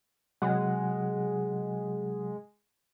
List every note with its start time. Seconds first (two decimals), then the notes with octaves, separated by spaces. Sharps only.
0.42 C3 F#3 G#3 F#5